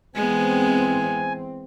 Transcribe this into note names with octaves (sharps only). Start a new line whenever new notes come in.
E3 G#3 B3 C4 G#5